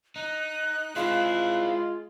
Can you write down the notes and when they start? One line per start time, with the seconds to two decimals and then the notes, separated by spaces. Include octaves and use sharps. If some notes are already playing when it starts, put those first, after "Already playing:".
0.16 D#4 F#6
0.96 G#3 C4 E4 F4 F5